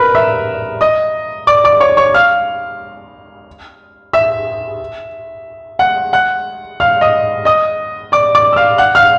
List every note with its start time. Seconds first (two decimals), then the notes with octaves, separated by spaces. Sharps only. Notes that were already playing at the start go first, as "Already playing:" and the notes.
Already playing: A#4 B4 A#5 B5
0.15 E5 E6
0.81 D#5 D#6
1.47 D5 D6
1.64 D5 D6
1.80 C#5 C#6
1.97 C#5 C#6
2.14 F5 F6
4.13 E5 E6
5.79 F#5 F#6
6.13 F#5 F#6
6.80 F5 F6
7.01 D#5 D#6
7.45 D#5 D#6
8.12 D5 D6
8.35 D5 D6
8.53 E6
8.56 F5 F6
8.78 F#5 F#6
8.95 F5 F6